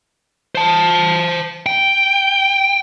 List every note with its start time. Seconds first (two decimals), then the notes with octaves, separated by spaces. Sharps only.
0.55 C5 A5
1.66 G5